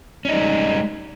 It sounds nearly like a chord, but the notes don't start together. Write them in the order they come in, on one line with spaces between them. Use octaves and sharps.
C#4 D#4 G3 G#3